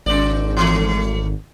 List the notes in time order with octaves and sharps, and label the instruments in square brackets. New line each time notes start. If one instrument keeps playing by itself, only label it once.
[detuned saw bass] G#1 [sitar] C#3 D5
[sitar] E3 A3